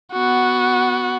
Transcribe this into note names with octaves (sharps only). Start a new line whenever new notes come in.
B3 F#4